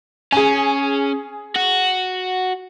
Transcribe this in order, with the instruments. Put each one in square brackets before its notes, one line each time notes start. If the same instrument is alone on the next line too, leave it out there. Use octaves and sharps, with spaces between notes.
[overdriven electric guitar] C#4 [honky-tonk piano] G#4 G#5
[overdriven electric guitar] F#4